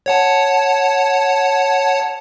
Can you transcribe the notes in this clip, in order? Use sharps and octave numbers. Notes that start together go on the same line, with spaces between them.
C#5 F#5 A5